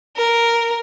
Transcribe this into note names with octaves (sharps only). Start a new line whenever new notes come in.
A#4